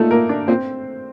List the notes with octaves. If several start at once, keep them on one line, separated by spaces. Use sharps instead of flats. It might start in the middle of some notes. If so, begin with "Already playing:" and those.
Already playing: A#2 A3 D#4 A4
A#3 A#4
D4 D5
A#2 C4 C5